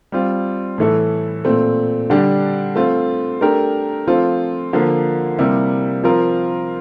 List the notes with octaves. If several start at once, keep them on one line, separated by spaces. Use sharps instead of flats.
G3 C4 F4
A2 E3 A3 E4 A4
A#2 A3 C4
D3 G3 D4 G4
A3 C4 F4
A3 D4 G4 A#4
F3 A3 C4 F4 A4
D3 F3 A#3
C3 G3 A#3 E4
F3 C4 F4 A#4